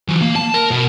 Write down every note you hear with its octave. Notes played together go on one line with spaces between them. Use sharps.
E3 F#3
A#3
A5
A#4
B2